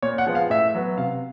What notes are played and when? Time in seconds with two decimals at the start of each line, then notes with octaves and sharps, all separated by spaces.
0.02 A#2 C#5
0.18 F#5
0.27 F3 G#3 B3
0.35 F5
0.50 A2 E5
0.74 F#3 B3
0.98 C3 F5